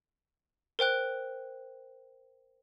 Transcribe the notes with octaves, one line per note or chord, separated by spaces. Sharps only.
A#4 C5 G5 F#6